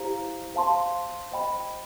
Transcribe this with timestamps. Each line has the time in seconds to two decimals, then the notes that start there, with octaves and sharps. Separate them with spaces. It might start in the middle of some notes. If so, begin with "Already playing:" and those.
Already playing: E4 G4 C5 F5 A#5
0.54 C5 F5 A5 C6
1.32 C5 D#5 G5 B5